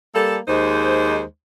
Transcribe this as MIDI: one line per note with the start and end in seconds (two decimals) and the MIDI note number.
0.15 0.37 55
0.15 0.37 58
0.15 0.37 69
0.48 1.23 39
0.48 1.23 56
0.48 1.23 63
0.48 1.23 72